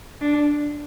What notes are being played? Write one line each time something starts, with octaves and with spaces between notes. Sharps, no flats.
D4